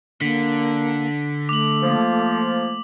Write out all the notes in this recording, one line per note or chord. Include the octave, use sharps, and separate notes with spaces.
D3 A#3 B6
A3 D6 F#7
F3 A#3